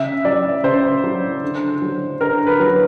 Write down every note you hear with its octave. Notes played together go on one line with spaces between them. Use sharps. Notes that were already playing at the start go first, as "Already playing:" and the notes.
Already playing: C#3 E5
F#3 D5
C#3 C5
F#3
D3
F#3
D3 A#4
B4
F#3